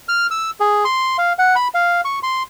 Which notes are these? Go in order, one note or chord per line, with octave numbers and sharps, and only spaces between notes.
F6
E6
G#4
C6
F5
F#5
B5
F5
C#6
C6